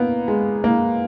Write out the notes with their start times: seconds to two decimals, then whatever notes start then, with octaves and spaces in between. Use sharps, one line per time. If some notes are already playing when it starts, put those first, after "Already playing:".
Already playing: A#3 B3
0.28 G#3
0.64 A#3